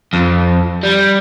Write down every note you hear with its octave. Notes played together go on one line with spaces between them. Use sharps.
F2
G3